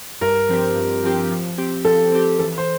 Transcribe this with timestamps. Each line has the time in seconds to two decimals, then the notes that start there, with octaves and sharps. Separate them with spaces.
0.21 G2 A#4
0.49 F3 C4 G4
0.75 G2
1.04 F3 C4 G4
1.31 F3
1.58 C4 G4
1.85 F3 A4
2.12 C4 G4
2.39 E3 A4
2.58 C5